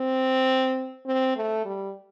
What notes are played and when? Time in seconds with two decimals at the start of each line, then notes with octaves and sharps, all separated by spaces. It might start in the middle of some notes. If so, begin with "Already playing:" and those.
Already playing: C4
1.06 C4
1.36 A3
1.65 G3